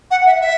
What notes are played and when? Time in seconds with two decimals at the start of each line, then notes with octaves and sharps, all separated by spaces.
0.11 F#5
0.26 E5
0.42 E5